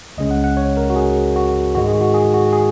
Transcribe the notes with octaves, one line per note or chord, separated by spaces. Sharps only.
C#2 C#3 G#3 C#4 D#5
F#5
F#5
C#5
A#4
F#4
G#4
F#4
G#2 D#3 G#3 F#4
G#4
F#4
G#4
F#4
G#4